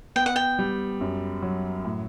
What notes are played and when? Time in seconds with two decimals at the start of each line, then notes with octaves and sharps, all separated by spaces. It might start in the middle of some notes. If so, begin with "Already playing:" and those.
0.16 B3 G5
0.26 F#5
0.36 G5
0.59 G3
1.01 F#2
1.42 F#3
1.85 A2